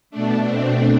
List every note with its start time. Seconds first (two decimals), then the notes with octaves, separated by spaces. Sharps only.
0.10 B2 A3 D4
0.48 C4